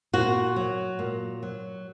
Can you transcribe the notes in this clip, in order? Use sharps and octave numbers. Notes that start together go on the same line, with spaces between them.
A#2 F#4
F#3
A#2
F#3